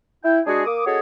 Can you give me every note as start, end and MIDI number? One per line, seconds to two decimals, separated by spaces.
0.23 0.39 64
0.23 0.39 79
0.46 0.61 56
0.46 0.61 62
0.46 0.61 66
0.46 0.61 68
0.65 0.82 58
0.65 0.82 86
0.65 0.82 87
0.85 0.99 61
0.85 0.99 66
0.85 0.99 68
0.85 0.99 69
0.85 0.99 73
0.85 0.99 75